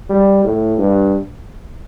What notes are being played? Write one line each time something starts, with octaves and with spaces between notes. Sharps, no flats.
G3
A2
G2